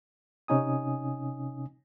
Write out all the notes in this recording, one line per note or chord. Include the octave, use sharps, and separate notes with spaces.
C3 C#4 D#4 G#5 D#6